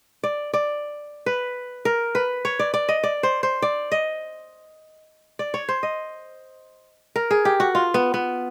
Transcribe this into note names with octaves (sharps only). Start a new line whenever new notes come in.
D5
D5
B4
A#4
B4
C#5
D5
D5
D#5
D5
C5
C5
D5
D#5
D5
C#5
C5
D#5
A#4
G#4
G4
F#4
F4
B3
B3